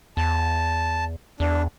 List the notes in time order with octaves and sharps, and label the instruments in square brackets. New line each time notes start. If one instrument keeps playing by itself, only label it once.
[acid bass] E2 [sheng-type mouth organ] A5
[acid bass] E2 [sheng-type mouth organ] D4